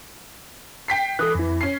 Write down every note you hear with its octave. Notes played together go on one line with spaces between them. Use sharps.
G5 B6 C7
E3 A4 D#6 F#6
F2 E4
C#4 C7